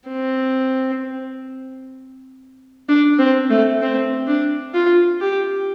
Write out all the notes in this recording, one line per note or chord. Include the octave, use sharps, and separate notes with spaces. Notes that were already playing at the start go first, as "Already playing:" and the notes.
C4
D4
C4
A3
C4
D4
F4
G4